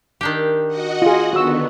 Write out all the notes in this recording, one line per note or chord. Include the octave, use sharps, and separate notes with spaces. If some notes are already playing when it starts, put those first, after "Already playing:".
D#3 D4 G4
F#4 D#5 F#5
F4 G#4
D3 D#3 B3 F#4 E6